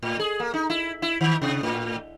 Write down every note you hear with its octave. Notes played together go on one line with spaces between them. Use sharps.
A2
G#4
A#3
D#4
E4
E4
D#3
C3
A2